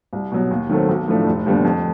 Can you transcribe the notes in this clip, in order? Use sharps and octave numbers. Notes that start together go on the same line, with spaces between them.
C2
B2 F#3
D#2
D#3 F#3 A3 C4
B1
A2 F3 A3 D4
F1
D#2 D3 G3 B3
F2